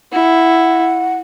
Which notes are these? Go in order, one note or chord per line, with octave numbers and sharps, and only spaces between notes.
E4 F#5